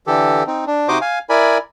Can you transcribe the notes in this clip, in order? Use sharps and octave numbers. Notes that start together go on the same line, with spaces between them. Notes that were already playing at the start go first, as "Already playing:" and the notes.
D3 E3 G4 A4
C4 D#4
D4
C3 D#4 F#4 C5 D#5 D6
F5 G#5
E4 A#4 D5 G#5 B5